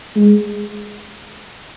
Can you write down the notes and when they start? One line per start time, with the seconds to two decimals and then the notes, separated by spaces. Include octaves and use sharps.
0.15 G#3